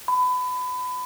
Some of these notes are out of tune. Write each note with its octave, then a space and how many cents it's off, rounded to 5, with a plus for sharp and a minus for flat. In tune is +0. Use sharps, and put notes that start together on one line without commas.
B5 +25